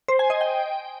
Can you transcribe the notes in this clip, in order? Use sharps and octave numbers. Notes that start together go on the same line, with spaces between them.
C5
G#5
D#5
G5